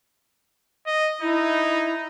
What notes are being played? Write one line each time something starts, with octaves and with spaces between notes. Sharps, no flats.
D#5
D#4 E4